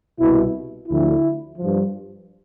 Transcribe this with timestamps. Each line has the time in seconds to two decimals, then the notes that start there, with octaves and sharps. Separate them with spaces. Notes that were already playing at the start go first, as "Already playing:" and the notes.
0.18 C2 B2 E4
0.87 D2 D3 F3 E4
1.57 G2 F3